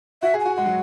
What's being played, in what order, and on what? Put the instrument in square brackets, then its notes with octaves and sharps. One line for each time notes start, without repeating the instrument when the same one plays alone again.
[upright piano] F#4 [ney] E5
[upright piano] G#4
[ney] G#5
[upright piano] F#4
[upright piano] G#3 [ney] F#5
[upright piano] F#3